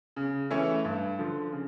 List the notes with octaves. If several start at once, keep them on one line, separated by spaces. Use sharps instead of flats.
C#3
E3 A3 C#4 E4
G2
D3 F3
C#3